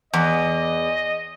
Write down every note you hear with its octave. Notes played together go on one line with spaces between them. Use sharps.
E2 D#5